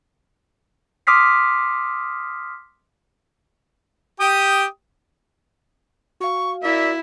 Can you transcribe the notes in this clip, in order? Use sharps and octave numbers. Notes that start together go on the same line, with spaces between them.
C6 D6 D#6 F6 B6 C7
G4 G5 D#6
F#4 F5 C#6
A#3 E4 D5 E5